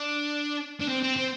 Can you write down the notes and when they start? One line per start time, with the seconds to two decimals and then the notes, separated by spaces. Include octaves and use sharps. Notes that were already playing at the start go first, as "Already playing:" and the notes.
Already playing: D4
0.81 D4
0.88 C4
1.02 C4
1.16 C4